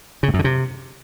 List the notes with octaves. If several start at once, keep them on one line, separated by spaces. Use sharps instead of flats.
C#3
A2
F#2
D3
C3